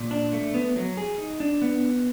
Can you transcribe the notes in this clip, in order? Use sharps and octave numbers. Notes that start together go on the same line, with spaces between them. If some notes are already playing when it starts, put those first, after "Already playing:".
Already playing: A#2
D4
A3
B3
F#3
G#4
D#4
D4
B3